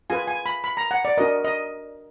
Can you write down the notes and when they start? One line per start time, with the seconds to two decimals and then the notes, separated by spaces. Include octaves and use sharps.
0.10 F4 G#4 B4 G#5
0.27 G#5
0.46 B5
0.64 B5
0.77 A#5
0.91 F#5
1.05 D5
1.17 D4 F#4 A#4 D#5
1.45 D#5